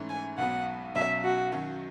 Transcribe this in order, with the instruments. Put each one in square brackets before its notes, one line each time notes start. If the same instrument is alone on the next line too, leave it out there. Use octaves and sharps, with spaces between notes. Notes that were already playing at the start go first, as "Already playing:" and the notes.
Already playing: [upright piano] G#2 E3 A3 C#4
[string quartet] G#5
[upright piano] B1 B2 F#3 B3 [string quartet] F#5
[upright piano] B1 B2 F#3 C#4 [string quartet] E5
[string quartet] F#4
[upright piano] F#2 D#3 F#3 C#4 F#4